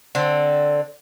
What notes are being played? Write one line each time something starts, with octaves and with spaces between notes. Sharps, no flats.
D3 C4